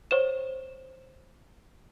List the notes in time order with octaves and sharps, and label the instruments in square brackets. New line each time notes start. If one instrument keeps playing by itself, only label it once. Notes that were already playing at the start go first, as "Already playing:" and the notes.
[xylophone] C5 C#5 E7